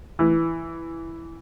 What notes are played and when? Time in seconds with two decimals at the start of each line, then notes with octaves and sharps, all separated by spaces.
0.19 E3